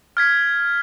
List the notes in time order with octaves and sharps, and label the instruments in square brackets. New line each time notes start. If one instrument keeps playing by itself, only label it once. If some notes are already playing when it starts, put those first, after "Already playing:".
[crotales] F6 G#6 B6